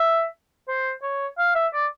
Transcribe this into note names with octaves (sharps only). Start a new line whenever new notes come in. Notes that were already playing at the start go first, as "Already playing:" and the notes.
Already playing: E5
C5
C#5
F5
E5
D5